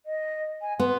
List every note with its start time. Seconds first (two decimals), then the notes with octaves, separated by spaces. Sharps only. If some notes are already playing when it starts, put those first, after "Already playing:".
0.06 D#5
0.62 G#5
0.80 B3 C6